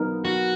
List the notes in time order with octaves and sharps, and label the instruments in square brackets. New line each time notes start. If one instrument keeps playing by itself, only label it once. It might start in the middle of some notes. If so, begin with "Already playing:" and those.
Already playing: [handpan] F#3 B3 D#4 A#4
[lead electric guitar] F#4